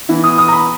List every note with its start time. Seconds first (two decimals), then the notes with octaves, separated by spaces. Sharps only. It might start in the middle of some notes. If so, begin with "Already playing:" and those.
0.09 E3 B3 E4
0.24 D#6
0.38 D#6
0.48 A#5
0.53 B5